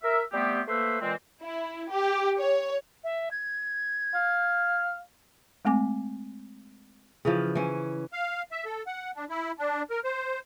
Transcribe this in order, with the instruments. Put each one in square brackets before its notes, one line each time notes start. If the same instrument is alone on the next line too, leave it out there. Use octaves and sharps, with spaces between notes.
[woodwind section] A#4 E5
G3 A3 B3 C4 G4
A3 A#3 B4 C5 E5
A#2 E3 G#3 C4
[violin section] E4
G4
C#5
[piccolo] E5
G#6
[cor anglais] F5
[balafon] G#3 A3 C4 G#5 D6
[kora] C#3 E3 F3
E3 C#4
[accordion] F5
E5
A4
F#5
D4
E4
D4
A#4
C5